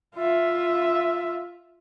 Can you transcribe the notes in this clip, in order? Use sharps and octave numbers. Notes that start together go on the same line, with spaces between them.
F4 E5